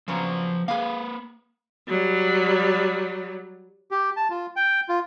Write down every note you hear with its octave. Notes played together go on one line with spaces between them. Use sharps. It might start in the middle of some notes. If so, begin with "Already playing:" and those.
C#3 F3 F#3 B3 C5 A#5
A#3 G#4 B4 F5
F#3 G3
G4
A5
F4
G5
F4